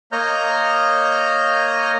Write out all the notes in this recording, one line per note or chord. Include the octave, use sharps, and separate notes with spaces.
A#3 C#5 D#5 A#5 F6 G6